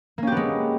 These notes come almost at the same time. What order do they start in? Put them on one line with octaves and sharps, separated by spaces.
A#3 C#4 G4 B3 G#3